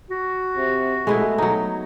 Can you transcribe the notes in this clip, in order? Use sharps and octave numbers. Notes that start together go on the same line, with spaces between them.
F#4
C3
G#3 A3 B3 E4
F#3 D#4